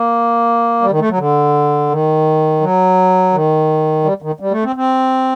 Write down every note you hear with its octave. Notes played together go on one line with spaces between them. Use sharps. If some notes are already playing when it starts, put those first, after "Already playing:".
Already playing: A#3
G3
D#3
A3
F#3
D3
D#3
F#3
D#3
G3
D#3
G3
A3
C4
C4